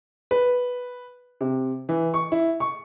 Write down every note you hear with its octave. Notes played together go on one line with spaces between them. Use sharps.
B4
C3
E3
C#6
E4
C#6